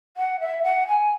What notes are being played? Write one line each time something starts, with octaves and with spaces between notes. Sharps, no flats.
F#5
E5
F#5
G#5